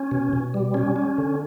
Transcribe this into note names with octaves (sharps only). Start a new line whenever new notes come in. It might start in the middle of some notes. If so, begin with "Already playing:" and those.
Already playing: C#4
B2
B2
G3
C#4
C#4
D3